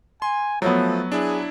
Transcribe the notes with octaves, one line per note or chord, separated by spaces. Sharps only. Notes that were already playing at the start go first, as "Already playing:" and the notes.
G#5 C6
F3 F#3 A3 B3
D4 E4 G#4